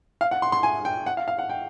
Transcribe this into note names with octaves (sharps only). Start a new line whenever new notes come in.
F5
F#5
C6
C6
G#5
G5
F#5
F5
F5
F#5
G5